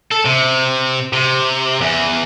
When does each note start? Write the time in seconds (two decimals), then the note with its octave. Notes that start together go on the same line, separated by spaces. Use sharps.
0.12 A4
0.25 C3
1.13 C3
1.81 E2